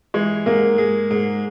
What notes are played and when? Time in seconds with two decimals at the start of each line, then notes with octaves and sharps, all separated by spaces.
0.14 E3 G#3
0.46 G#2 A#3
0.78 G#3
1.11 G#2